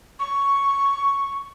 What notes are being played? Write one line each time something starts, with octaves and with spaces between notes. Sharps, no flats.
C#6